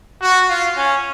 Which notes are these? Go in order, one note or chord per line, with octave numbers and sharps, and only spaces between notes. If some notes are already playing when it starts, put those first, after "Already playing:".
F#4
F4
C#4